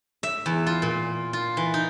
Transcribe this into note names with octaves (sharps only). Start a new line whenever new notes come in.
E5
E2
F4
A#2
F4
E3
D#4